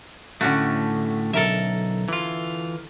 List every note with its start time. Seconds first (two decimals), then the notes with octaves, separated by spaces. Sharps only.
0.41 A2 D3 A3 C#4 F#4
1.33 B1 A4 A#4 E5
2.09 E3 F4